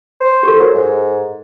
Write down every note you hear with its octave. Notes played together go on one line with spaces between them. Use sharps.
C5
G4 A4
F#3 A#4
G#2